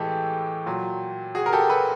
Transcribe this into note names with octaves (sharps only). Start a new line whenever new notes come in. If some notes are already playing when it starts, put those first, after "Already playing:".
Already playing: A2 E3 G#3 G4 A4
A#2 F#3
F#4 G#4
A#4
G4 A4
A4 B4